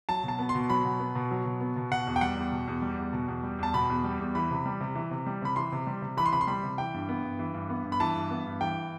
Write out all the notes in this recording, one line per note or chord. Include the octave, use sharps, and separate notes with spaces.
F#3 A5
B2 A5
B3
C6
B2
F#3 B5
B2
B3
B2
F#3
B2
B3
B2
B2 F#5
E2
G5
G3 F#5
E2
B2
E2
G3
E2
B2
E2
G3
E2 A5
B2 B5
E2
G3
E2
E3 B5
C3
G3
C3
E3
C3
G3
C3 B5
E3 C6
C3
G3
C3
E3 B5
C6
C3 B5
C6
G3 B5
C3
E3 G5
G2
B3
G2
E3
G2
B3
G2
B5
E3 A5
G2
B3
G2
E3 G5